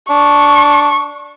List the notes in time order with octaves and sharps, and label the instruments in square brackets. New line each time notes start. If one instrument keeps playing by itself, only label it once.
[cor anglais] D4 [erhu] C#6